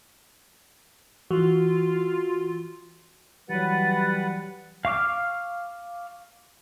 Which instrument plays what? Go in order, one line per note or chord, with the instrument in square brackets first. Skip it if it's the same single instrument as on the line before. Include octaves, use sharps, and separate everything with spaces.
[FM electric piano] E3 [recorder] F4 [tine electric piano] F#4
[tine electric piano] E3 F#3 [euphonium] G3 [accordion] B4 F#5 [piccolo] A6
[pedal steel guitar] F5 C#6 D6 F6